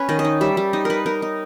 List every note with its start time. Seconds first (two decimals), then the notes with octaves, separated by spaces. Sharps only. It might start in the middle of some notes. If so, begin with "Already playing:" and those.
Already playing: C#4 B4 C#5
0.09 D#3 D#5
0.19 D#5
0.24 D#4
0.41 G3 E5
0.57 G3
0.73 D#4 D#5
0.85 D#4 A#4 B4
1.06 D#4 A#4
1.22 D#4